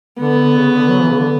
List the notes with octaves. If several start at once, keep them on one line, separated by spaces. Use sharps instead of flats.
D3 B3
D3
C#3
D3
F#3
E3
C#3
D3